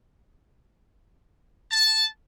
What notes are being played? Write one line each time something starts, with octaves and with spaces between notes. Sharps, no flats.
A5